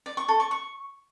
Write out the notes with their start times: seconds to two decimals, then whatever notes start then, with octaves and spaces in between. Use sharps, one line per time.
0.06 D5
0.17 C#6
0.28 A4
0.40 C#6
0.51 C#6